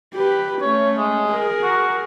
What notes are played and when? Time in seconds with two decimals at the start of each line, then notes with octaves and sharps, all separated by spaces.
0.14 G4 B4
0.61 A3 C#4 C#5
0.97 G#3
1.28 G#4 A#4
1.63 F#4